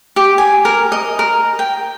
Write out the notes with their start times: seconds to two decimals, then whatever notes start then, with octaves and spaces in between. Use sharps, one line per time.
0.16 G4
0.38 G#5
0.65 A#4
0.92 D#5
1.19 A#4
1.59 G5